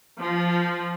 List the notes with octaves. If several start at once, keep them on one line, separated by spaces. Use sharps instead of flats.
F3